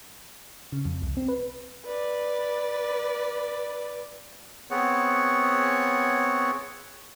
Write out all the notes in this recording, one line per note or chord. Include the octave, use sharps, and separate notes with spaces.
C#3
F2
C2
C4
B4
B4 D5
B3 C4 G#4 C#5 F#5